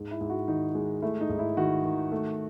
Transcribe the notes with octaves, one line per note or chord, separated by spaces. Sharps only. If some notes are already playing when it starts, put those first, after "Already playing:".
Already playing: G#2
E4
G#2
F#4
D#3 D#4
G#3
A3 E4
D#4
G#2
E4
D#3 F#4
D#3
A3